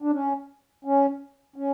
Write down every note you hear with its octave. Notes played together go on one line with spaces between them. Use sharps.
D4
C#4
C#4
C#4